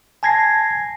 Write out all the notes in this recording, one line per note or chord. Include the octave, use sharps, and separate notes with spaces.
G#5 A5 G#6 A#6 C7